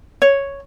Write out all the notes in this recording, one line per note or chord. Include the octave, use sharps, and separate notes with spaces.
C#5